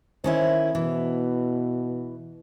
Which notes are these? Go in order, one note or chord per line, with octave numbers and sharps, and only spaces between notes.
D#3 C#4 E4 C5
B2 E3